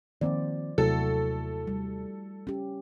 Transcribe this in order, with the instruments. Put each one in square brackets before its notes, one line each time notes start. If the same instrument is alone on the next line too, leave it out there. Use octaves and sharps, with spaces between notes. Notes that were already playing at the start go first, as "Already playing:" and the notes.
[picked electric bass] D#3 A#3 C4 [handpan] F3 C5 D5
[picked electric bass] D#2 C3 F#3 [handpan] A3 E4 F#4 [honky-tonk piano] A4
[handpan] G3
C#4 G4